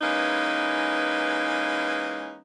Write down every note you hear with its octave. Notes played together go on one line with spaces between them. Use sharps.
E3 G#3 A#3 C#4 D#4 B4